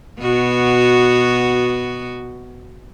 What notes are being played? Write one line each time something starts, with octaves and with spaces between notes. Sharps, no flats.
B2 B3 F#4